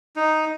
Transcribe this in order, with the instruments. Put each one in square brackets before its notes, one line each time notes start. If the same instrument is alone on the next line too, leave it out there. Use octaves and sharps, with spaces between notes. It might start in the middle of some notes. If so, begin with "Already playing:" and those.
[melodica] D#4